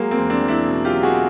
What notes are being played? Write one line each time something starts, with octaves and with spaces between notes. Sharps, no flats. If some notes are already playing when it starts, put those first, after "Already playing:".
Already playing: F#3 G#3 A#3
A#3 C4
E2
C4 D4
E2
D4 E4
B2
F4 G4
F#3
F#4 G#4